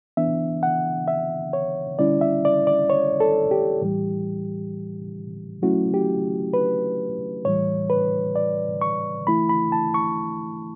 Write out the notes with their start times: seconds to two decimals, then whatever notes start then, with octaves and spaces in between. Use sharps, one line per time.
0.17 E3 B3 D4 E5
0.63 F#5
1.08 E5
1.53 C#5
1.99 D3 G3 C#4 E4 D5
2.21 E5
2.45 D5
2.67 D5
2.90 C#5
3.20 A4
3.51 G4
3.81 A2 E3 G3
5.62 F#3 A3 C#4 E4 F#4
5.94 G4
6.54 B4
7.45 A2 E3 G3 C#5
7.90 B4
8.36 D5
8.81 C#6
9.27 E3 A3 E4 B5
9.49 B5
9.72 A5
9.94 C#6